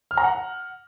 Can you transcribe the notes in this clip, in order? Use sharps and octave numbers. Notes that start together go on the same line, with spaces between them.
F6
A#5
F#5